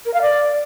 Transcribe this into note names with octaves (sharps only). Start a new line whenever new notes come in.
A#4
F5
D5